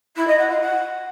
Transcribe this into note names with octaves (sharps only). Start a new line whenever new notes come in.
E4
D#5
F#5
F4
F#5